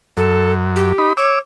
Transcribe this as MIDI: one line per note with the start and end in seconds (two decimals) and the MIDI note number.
0.17 0.93 42
0.17 0.53 69
0.76 1.12 67
0.98 1.13 63
0.98 1.13 83
1.17 1.39 73
1.17 1.39 86
1.17 1.39 88